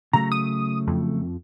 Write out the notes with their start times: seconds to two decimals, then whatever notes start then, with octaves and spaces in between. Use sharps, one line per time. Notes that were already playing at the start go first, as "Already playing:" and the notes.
0.13 C#3 F#3 A3 A#5
0.32 D#6
0.88 F2